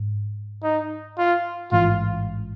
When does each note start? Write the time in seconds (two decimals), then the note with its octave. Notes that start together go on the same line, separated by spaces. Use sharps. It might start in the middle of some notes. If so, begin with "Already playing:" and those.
Already playing: G#2
0.63 D#4
1.18 F4
1.72 A1 G#2 E3 G#3 F4